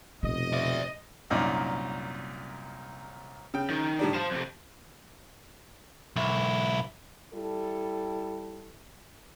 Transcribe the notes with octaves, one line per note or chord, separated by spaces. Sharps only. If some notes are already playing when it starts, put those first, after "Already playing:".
F1 B2 D#5
D5 E5
C2 F#2 A#2 D#4 D5
C#3 G5
D#3
A2 G3 D4
C5 F5 A5 E7
F2 C3
B1 E4
G3 E4 A4